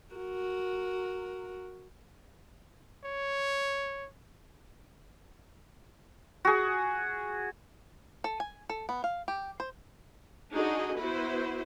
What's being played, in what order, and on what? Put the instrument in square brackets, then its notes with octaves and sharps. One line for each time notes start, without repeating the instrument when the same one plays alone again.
[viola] F#4 A#4
[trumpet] C#5
[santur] F#4 G#4
[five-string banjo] A4
G#5
A4
B3
F5
G4
C5
[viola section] D4 D#4 F#4 G#4 D#5
B3 E4 F#4 B4 C5